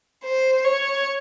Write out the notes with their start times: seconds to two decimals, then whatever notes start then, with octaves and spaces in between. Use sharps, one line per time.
0.25 C5
0.64 C#5